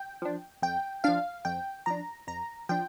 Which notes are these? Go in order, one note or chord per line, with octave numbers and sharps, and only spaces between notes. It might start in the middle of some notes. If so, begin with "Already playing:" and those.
Already playing: G5
F3 D4
F2 G5
F3 D4 F5
F2 G5
F3 D4 A#5
F2 A#5
F3 D4 G5